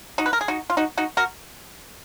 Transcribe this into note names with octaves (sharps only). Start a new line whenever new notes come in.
D#4 F#4
B4
A#4
G#4
D#4 F#4
F4
D#4 F#4
D#4 F#4
F#4 A#4